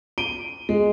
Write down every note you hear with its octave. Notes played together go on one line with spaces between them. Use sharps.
D7 D#7 G7
G#3